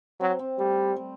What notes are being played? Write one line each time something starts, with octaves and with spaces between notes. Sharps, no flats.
F#3 C4
C4
G3 A3
G3